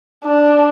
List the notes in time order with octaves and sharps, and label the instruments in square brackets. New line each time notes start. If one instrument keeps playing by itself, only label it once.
[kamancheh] D4